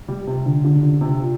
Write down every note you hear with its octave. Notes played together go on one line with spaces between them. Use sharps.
G3
C3
D3
D3
D3
C3
A#2